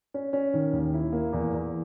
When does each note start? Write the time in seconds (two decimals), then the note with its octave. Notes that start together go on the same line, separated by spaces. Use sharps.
0.14 C#4
0.33 C#4
0.54 D#3
0.73 D#2
0.93 E4
1.13 A#3
1.33 E2
1.53 E2